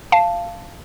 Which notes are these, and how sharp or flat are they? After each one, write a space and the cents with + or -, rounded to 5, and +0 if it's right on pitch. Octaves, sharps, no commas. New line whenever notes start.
F5 -15 A5 +0